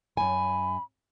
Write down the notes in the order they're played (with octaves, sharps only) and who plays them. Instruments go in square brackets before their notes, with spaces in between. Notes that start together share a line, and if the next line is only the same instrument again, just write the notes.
[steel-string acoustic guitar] F#2 G#5 [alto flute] B5